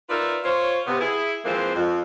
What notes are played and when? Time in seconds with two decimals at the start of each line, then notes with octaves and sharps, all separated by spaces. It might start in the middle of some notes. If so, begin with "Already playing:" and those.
0.09 D#4 F4 A#4 B4 D5 E5
0.43 F4 C5 C#5
0.87 C3 B3
1.00 E4 G#4
1.45 E3 F3 G#3 A#3 C4
1.75 F2